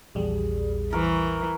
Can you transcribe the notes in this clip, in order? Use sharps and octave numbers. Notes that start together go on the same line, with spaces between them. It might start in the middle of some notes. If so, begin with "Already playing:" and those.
A#1 E2 G3 G#4
E3 A#4 C#6